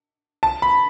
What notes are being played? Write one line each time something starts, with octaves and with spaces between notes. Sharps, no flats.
A5
B5